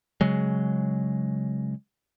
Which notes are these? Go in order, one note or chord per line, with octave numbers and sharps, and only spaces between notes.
C#3 F#3 G#3